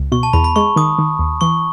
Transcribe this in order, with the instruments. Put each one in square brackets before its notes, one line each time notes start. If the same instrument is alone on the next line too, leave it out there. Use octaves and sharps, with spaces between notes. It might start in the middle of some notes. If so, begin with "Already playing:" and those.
Already playing: [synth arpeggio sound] C#2
[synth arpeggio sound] B2 [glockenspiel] C#6
[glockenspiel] A5
[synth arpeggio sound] E2 [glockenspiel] B5
[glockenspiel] B5
[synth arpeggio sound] G#3 [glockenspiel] C#6
[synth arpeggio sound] D#3 [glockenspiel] D#6
[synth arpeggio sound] D#3
D#2
[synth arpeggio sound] E3 [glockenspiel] C#6